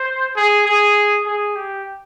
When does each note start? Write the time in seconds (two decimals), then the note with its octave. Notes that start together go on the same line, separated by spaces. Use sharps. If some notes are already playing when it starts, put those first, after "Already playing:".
Already playing: C5
0.36 G#4
0.66 G#4
1.26 G#4
1.56 G4